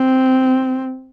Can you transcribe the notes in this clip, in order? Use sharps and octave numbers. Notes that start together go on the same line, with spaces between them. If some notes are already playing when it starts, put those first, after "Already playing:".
Already playing: C4